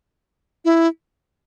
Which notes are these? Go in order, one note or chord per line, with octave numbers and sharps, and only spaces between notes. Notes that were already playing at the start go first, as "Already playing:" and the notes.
E4